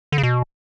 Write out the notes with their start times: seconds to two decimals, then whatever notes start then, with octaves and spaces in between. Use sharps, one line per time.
0.12 D3
0.18 C#3
0.23 B2